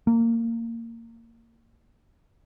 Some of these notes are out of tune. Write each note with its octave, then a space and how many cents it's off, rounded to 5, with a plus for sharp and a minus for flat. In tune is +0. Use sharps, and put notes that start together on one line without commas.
A#3 -20